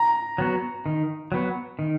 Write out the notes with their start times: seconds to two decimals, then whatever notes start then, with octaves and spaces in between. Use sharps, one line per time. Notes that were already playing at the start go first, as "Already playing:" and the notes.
Already playing: A#5
0.38 F#3 B3 F#4
0.86 D#3
1.32 F#3 B3 F#4
1.79 D#3